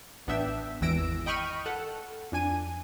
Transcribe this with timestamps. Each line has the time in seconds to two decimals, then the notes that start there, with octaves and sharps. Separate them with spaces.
0.27 A1 B3 D4 E5 G5 E6
0.81 G#1 E2 E3 E6 A#6 D7
1.26 D#5 G5 B5 C#6 F6 D#7
1.66 A4 F#5
2.32 F2 D4 G#5 D#7